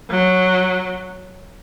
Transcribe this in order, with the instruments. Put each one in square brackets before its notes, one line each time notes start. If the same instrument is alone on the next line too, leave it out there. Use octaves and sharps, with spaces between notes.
[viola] F#3